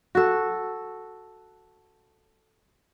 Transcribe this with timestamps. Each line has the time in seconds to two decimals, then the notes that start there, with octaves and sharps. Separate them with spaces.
0.15 F#4 A4